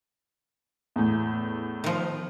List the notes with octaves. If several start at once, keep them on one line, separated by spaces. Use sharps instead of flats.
E2 A2
D#3 F3